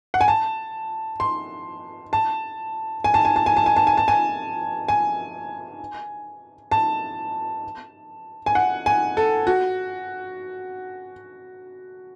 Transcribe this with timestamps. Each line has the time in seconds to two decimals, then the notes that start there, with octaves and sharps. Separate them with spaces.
0.14 F#5
0.21 G#5
0.28 A5
1.20 C6
2.13 A5
3.04 G#5
3.14 A5
3.25 G#5
3.36 A5
3.46 G#5
3.57 A5
3.66 G#5
3.76 A5
3.87 G#5
3.97 A5
4.08 G#5
4.88 G#5
6.71 A5
8.46 G#5
8.55 F#5
8.86 G#5
9.17 A4
9.47 F#4